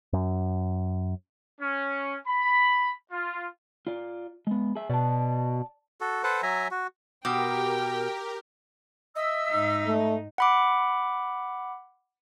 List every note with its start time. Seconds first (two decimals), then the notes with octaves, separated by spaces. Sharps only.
0.13 F#2
1.60 C#4
2.27 B5
3.12 F4
3.87 F4 D5
4.47 G#3 B3
4.75 G#4 E5
4.90 B2 D5 A5
6.01 F#4 A4
6.24 A4 B4 C5 F#5
6.43 F#3 E5 G#5 A#5
6.71 F#4
7.25 B2 G4 A#4 G5 D6
9.16 D#5 E5 E6
9.50 G#2 D#4
9.87 A3
10.38 F#5 B5 D6